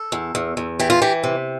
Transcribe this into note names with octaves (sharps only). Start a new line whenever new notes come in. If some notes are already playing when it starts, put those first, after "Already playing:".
Already playing: A4
E2
E2
E2
E3 G4
F4
E3 G4
C3